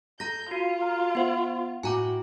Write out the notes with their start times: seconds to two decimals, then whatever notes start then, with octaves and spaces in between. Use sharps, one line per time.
0.20 A4 A#5 G6 A#6
0.51 F4 F#4 C7 D#7
0.81 A#5 F6
1.15 B3 C5 F#5
1.83 A2 F#4 G5 G#5 A#5 D6